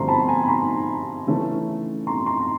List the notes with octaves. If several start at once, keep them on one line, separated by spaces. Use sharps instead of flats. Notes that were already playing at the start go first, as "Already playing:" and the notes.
Already playing: G2 D3 F3 A3 C4 A#5 C6
A5 B5
G#5 A#5
B5
A#5 C6
C#3 E3 A3 C#4
A#5 C6
A#5 C6
A#5